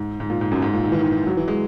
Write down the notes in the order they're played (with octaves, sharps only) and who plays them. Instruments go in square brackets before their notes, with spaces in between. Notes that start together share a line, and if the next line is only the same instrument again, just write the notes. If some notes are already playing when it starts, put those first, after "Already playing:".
Already playing: [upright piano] G#2
G#2
A#2
G#2
F#2
G#2
A#2
D#3
E3
D#3
F#3
E3
G#3